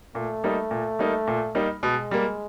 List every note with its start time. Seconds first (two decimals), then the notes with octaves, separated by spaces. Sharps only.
0.15 A#2 A3
0.44 G3 A#3 D#4
0.71 A#2
0.99 G3 A#3 D#4
1.27 A#2
1.55 G3 A#3 D#4
1.83 B2 G#3
2.11 G3 A#3